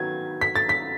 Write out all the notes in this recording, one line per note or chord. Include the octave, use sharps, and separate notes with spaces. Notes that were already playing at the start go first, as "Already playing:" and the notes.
Already playing: D#3 F#3 B3 G#6
B6
A6
B6